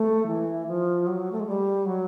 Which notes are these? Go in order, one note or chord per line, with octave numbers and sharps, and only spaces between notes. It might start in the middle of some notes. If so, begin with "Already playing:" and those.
Already playing: A3
E3
F3
F#3
A3
G#3
G3
F#3